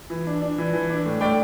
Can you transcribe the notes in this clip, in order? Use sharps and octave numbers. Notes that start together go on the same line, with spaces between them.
E3
D4
D4
E3
E3
D4
A2
A2 D5 G5